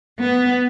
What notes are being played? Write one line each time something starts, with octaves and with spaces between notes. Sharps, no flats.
B3